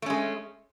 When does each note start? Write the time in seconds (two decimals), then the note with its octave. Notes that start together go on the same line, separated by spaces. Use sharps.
0.02 A3
0.06 C#4
0.10 G#3